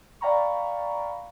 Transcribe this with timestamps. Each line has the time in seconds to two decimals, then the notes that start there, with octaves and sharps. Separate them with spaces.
0.21 D5 F5 G5 A#5 B5 C#6